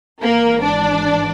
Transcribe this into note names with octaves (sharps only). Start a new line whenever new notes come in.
G#1 G#2 E3 A#3 A#4
D4 D5